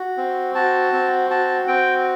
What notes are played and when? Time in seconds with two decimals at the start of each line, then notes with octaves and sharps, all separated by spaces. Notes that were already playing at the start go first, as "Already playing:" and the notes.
Already playing: F#4
0.17 C4
0.55 F#4 A5
0.93 C4
1.30 F#4 A5
1.68 C4 G5